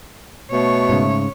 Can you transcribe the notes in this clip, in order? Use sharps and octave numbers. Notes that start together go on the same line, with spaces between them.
B2 A3 C#5
G#2 C#3